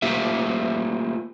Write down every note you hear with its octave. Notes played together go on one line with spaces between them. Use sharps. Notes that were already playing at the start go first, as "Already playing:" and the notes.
A3 A#3 F4 G4 E5